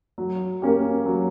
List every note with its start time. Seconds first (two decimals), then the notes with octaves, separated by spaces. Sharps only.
0.18 F#3
0.62 A#3 C#4 G4
1.06 F#3